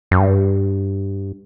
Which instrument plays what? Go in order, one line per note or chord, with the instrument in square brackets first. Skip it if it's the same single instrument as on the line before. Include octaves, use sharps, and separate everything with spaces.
[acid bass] F#2
G2